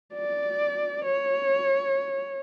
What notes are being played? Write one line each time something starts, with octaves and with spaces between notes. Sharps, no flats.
D5
C#5